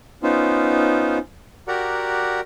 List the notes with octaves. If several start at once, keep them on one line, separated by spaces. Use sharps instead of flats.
B3 C#4 D#4 F4 C5
F#4 G4 A#4 D5 F#5 A#5